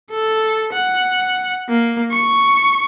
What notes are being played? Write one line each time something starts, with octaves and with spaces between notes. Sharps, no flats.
A4
F#5
A#3
C#6